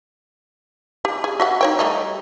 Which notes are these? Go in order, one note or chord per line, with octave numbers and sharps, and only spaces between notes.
G4
G#4
F#4 E5 F#5
D#4 C#5 G5
G3 A3 D#4